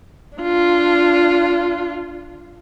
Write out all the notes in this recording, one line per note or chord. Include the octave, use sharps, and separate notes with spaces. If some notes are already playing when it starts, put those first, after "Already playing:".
D4 F4